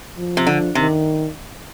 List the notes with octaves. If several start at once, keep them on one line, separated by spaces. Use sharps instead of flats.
F3
C3
D3
C3 D#3